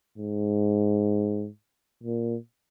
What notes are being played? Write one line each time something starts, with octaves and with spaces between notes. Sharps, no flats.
G#2
A#2